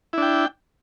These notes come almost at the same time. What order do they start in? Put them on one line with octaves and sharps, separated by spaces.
E4 D4 G5